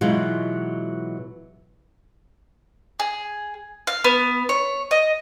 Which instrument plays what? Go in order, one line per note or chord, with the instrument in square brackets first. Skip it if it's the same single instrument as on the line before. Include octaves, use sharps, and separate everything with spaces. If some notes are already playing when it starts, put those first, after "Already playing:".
[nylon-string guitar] B2 E3 F#3 G#3 D#4 F4
[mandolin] G#4
F5
B3
C#5
D#5